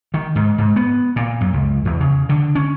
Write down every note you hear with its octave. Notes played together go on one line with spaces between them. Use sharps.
D#3
G#2
G#2
B3
A#2
F#2
C#2
E2
C#3
D3
C#4